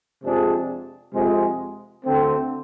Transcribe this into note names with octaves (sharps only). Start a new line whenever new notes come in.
F2 C3 G#3 D4 G#4
F2 C3 G#3
D2 D3 A3 C4